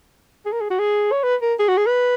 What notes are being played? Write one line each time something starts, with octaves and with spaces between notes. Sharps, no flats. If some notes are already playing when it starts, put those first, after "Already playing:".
G#4
A#4
G#4
F#4
G#4
C#5
B4
A#4
G#4
F#4
G#4
B4